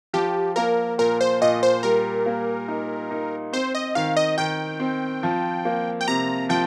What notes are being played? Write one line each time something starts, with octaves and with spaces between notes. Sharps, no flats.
F3 G4
A#3 A#4
A#2 A#4
C5
A#2 D#5
C5
G3 A#4
A#3
D#4
D#4
C4 C5
D#5
D#3 F5
D#5
D#3 G5
C4
F3
A#3
G5
C3 A#5
F3 G5